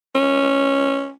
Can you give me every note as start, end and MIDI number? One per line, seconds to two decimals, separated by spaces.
0.15 1.11 61